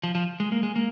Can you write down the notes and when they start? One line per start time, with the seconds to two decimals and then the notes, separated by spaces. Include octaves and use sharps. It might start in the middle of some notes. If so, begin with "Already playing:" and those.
0.03 F3
0.15 F3
0.40 G#3
0.52 A#3
0.63 G#3
0.76 A#3